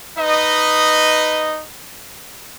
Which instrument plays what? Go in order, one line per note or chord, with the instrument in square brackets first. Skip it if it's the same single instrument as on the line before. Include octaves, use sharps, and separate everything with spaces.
[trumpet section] D#4 B4 D#5